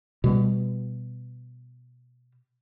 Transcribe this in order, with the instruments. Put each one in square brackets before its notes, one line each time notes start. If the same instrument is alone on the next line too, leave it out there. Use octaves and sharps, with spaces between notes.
[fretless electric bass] B2 G3 G#3 B3